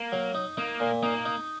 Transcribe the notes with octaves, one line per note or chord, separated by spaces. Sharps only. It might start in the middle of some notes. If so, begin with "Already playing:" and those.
Already playing: A#3
F#3
D#4
A#3 D#4
A#2
A#3 D#4
D#4